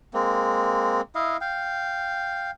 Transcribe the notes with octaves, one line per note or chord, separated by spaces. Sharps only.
G#3 A#3 C4
E4 D#5 F5
F5 G5